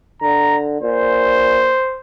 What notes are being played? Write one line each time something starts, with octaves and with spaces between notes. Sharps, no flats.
D3 A#5
A#2 C5